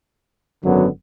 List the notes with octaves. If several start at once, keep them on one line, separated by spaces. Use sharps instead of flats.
G#1 F#2 D3 F#3 B3